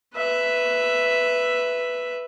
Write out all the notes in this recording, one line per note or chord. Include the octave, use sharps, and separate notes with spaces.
B4 E5